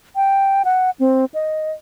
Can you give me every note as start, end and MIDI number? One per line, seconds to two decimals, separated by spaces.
0.16 0.63 79
0.65 0.90 78
1.00 1.25 60
1.34 1.72 75